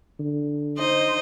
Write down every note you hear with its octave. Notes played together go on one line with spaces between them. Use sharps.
D3
D#4 C5 D#5